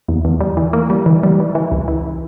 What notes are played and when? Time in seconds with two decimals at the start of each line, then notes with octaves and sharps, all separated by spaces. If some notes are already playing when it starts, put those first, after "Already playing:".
0.08 E2
0.25 E2
0.41 G3
0.57 E3
0.73 A#3
0.90 G3
1.06 E3
1.23 G3
1.40 E3
1.55 E3
1.72 C#2
1.88 E3